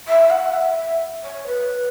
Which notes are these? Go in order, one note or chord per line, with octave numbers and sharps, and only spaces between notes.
E5
F#5
E5
C#5
B4